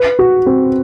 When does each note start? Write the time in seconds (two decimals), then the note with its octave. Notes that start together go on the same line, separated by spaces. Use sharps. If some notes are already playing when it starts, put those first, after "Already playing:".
Already playing: B4
0.19 F#4
0.46 C4